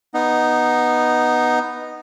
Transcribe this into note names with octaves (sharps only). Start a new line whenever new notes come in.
B3 D#4